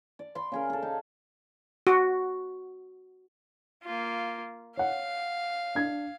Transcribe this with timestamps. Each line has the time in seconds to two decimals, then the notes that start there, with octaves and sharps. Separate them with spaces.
0.19 D5
0.35 B5 C6
0.52 C#3 G#4 A#4
0.70 G#4 A4
0.82 D#4 F5
1.87 F#4
3.83 A#3 F4
4.77 C#5 F5 F#5
5.75 D4 G#6